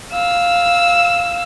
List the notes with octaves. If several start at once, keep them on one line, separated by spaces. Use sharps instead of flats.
F5 E6